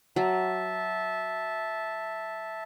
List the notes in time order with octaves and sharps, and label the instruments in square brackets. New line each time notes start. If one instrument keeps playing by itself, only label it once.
[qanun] F#3 [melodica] E5 A5